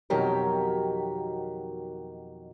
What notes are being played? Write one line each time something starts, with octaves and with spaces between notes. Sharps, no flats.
F2 B2 D#3 F#3 G4 A#4